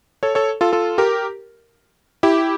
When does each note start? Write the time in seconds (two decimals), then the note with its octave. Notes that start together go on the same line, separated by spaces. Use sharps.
0.23 A4 C#5
0.35 A4 C#5
0.61 F4 A4
0.73 F4 A4
0.98 G4 A#4
2.23 E4 G4